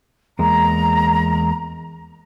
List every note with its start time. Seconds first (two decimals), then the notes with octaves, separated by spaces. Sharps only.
0.39 E2 G#3 A#3 A#5